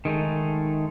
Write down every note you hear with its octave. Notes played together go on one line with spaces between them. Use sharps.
D#3 G#3 A3 D#4